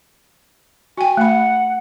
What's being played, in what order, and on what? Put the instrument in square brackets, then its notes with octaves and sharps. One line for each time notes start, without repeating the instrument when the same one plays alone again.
[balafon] F#4 G5 [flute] G#5
[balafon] A3 B5 [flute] F#5